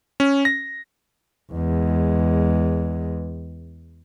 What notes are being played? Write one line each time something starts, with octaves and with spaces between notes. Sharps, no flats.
C#4
A#6
E2 G#3